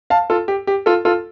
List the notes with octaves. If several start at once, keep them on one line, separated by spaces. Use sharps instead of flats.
F5 A5
F4 A4
G4
G4
F4 A4
F4 A4